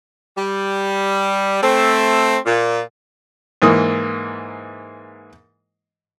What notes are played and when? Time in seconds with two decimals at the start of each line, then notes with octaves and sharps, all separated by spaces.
0.37 G3
1.63 A3 C4
2.46 A#2
3.62 G#2 E3 A#3 D#6